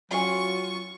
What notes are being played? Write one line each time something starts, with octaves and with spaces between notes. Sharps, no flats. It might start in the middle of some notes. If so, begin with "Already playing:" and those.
F#3 C#4 F4 G#5 C#6